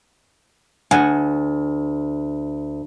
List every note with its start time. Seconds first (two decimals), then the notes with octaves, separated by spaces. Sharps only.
0.91 D2 F#5 G#5